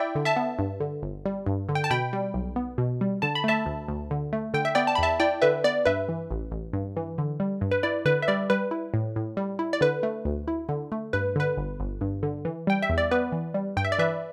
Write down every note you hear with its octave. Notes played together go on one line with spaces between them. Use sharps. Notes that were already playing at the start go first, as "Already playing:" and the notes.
Already playing: E4 D5 E5 G5
D3
E5 A5
B3
G2
D3
G1
G3
G2
D3
G5
A5
B2 G5 B5
G3
B1
B3
B2
G3
D3 A5
B5
A3 E5 A5
D2
D2
D3
A3
D3 G5
E5
B3 D5 G5
A5
B5
E2 E5 A5
E4 D5 G5
D3 B4 E5
B3 D5
G2 B4 E5
E3
A1
A1
G2
E3
D3
G3
G2
B4
E4 D5
D3 B4
E5
G3 D5
G3 B4
E4
A2
A2
G3
E4
D5
D3 B4
A3
D2
E4
D3
A3
G2 B4
D3 B4
G1
G1
G2
D3
E3
G3 G5
E5
E2
D5
B3 B4
E3
G3
G2 G5
E5
D5
E3 B4 E5